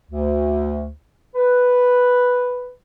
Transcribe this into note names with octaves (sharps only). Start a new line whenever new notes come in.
D2
B4